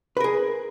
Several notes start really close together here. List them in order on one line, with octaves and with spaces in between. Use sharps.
B4 A#4 G#4